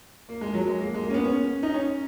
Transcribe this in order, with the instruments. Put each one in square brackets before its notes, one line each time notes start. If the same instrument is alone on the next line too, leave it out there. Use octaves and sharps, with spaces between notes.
[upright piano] A#3
G#3
F#3
G#3
A#3
G#3
A#3
C#4
B3
C#4
D#4
C#4